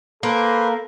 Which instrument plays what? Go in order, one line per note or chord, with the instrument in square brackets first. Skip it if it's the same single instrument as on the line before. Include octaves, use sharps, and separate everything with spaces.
[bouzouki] A#3 [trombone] A4 [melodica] B4 C5